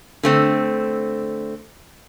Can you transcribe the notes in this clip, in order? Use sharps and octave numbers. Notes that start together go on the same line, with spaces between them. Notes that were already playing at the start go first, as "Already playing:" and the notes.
D3 A3 C4